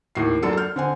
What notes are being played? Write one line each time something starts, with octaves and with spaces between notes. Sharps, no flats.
D#2 A2 C7
F#2 D4 A4 C#7
F6 G6
D3 C4 G#5